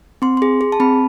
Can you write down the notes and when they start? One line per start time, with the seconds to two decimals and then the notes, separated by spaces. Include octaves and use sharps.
0.22 C4 C6
0.37 G#4 C6
0.61 G#4
0.72 A5
0.80 C4 B5